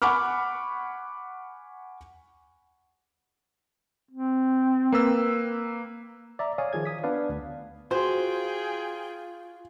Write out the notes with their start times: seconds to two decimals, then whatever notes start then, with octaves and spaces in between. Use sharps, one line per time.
0.02 F#5 G#5 B5 C#6 D6 F6
4.11 C4
4.92 A#3 B4 E6
6.39 D5 E5 A#5
6.58 C#5 D5 F5 G#5 D#6
6.73 D#3 F3 G#4 G#6
6.85 D#6 B6
7.04 B3 D4 B4 D5 F5
7.29 D2
7.91 F4 F#4 G#4 C5 G5